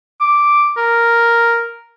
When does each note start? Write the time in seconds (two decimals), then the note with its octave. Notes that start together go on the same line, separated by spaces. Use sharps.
0.21 D6
0.77 A#4